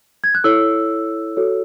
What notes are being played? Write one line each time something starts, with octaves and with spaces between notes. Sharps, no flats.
G#6
F#6
E4 A4 C#5 E6
F#4 A4 C#5